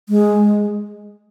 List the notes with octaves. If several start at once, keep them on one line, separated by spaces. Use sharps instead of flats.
G#3